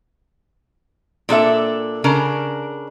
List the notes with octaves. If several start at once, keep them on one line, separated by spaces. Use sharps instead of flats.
A#2 D4 A4 E5
C#3 D4 A#4